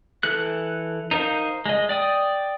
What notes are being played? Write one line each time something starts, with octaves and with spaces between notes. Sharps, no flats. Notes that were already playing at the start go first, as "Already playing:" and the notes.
E3 A4 F#6
D#4 A#4 C5 F5
G#3 D#5
D5 G5 D#6